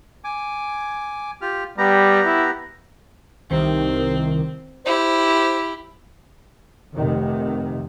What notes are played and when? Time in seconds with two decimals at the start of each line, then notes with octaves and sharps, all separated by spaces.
0.24 G#5 D6
1.41 F4 G4 F6
1.78 G3 B3 G4 A#5
2.26 E4
3.50 C2 C3 D#3 C4
4.84 E4 G4 C5
6.95 F1 C3 D#3